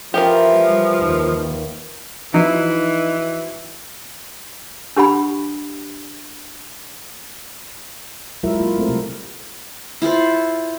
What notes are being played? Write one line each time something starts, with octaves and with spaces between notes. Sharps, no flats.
E3 F3 F4 G4 A#4
G3
D#2 D#3
E3 F3 D#4 E4 F#4
D4 G4 F#5 B5
F#3 G#3 E4 F4 A#4 E5
A#3 F4
A3 C4 A4 A#4
C3 G3
E4 F4 A4 C5